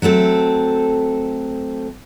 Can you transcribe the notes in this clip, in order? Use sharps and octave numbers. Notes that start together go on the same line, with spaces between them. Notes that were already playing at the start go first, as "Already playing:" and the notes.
F#3 A3 C4 A4